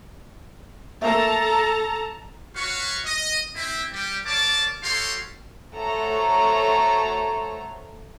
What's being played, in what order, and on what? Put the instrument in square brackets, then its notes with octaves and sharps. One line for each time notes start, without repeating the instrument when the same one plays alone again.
[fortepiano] A3 A#3 [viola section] A4 A5 A#5
[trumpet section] F#4 B4 C#5 F5 C#6
D#5
C4 E4 E5
G3 G4
A#4 C#5 D5 F5 A5 D6
F#4 G4 A4 C#5 F5 C6
[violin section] A3 F#4 A4 C5 C#5 A#5